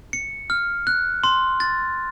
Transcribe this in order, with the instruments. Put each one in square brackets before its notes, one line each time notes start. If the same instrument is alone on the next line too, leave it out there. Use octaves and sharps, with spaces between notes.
[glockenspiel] C#7
F6
F#6
C6
A6